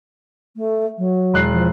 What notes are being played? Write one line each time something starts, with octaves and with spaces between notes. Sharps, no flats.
A3
F#3
E1 F#6 C7
F3